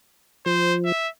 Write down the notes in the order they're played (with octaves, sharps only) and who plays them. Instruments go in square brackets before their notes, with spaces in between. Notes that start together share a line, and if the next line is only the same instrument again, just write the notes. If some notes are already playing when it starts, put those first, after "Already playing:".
[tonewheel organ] F3 [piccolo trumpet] C5
[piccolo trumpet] E5